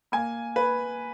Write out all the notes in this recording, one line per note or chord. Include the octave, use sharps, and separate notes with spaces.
A#3 G#5
B4